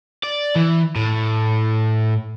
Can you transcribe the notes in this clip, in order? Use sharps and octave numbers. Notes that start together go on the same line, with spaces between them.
D5
E3
A2